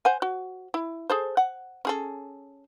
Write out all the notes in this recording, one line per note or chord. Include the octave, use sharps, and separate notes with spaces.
C5 F#5 G#5
F#4
E4
G#4 A4 C5
F#5
C#4 G#4 A4